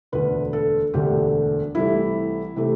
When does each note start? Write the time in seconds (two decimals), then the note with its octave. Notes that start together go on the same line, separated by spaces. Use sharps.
0.12 E1 D2 D3 A3 B4
0.53 A4
0.94 E1 D2 D3 A3 G4
1.75 C2 C3 E3 A3 E4
2.56 C3 E3 A3